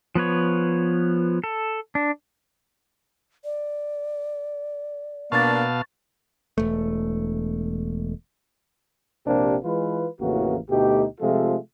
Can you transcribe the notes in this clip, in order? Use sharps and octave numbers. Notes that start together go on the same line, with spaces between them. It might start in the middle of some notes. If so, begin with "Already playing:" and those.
F3 B3 B4 C#5
A4
D4
D5
B2 A#3 D4 F5 A5 C#6 A6
E1 A3
A#1 C3 A#3 D4 G4 C5
E3 G#3 F4 B4
A1 F2 C#3 E3 A#3 F#4
D2 B2 A3 D#4 G4
C3 F3 G#3 A3 F4 A4